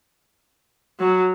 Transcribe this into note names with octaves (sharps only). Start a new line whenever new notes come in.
F#3